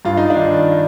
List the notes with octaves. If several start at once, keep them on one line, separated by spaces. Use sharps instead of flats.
G2 F4
D#4
D4
D#3